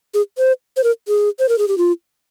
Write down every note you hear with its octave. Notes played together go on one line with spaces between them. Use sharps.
G#4
C5
C5
A#4
G#4
C5
A#4
G#4
G4
F4